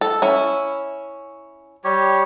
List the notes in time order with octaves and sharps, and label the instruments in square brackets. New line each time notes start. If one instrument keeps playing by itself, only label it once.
[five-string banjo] A4
C#4 E4
[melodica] G3 G4 C#5